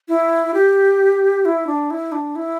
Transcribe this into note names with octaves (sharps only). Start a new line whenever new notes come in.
E4
G4
E4
D4
E4
D4
E4